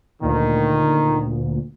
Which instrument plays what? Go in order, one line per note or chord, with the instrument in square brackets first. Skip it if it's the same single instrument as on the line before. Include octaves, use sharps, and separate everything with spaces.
[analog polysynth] D2 A#2 [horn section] D#3